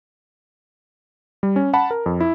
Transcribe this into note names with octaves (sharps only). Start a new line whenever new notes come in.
G3
C#4
F#5 A5 B5
A#4
F2
E4